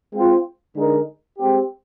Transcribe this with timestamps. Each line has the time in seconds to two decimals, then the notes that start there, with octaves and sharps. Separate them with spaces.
0.13 G#3 C4 F4 C5
0.76 D3 G#3 D#4 A#4
1.38 G#3 C4 G4